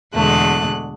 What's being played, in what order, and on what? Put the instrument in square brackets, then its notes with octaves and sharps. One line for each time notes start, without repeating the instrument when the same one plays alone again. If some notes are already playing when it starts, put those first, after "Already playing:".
[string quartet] E2 B2 D3 G#3 A3 F#6